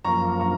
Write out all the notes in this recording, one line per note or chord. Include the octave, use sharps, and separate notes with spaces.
F#2 F3 A#3 A#5 C#6
A#5 C#6